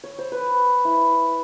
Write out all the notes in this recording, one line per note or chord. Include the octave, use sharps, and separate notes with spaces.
C#5
C5
B4
E4